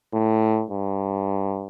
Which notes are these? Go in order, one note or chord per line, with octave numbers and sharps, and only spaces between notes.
A2
G2